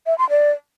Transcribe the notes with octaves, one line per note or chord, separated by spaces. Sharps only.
E5
C6
D5